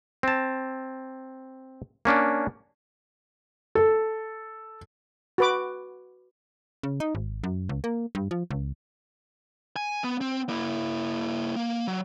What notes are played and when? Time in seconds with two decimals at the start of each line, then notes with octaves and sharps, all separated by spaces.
0.23 C4 A5
2.05 A#3 C#4 D4
3.75 A4
5.38 F#4 B4 D6
6.83 C#3
7.00 D#4
7.15 G#1
7.44 F#2
7.69 C#2
7.84 A#3
8.15 G2
8.31 F3
8.51 C#2
9.76 G#5
10.04 B3
10.21 C4
10.49 A#3 E4
11.56 A#3
11.88 F#3